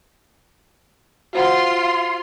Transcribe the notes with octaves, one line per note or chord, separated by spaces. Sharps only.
F4 F#4 C5 F#5 C6